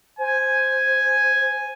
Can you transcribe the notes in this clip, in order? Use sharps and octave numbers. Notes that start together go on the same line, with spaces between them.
C5 G#5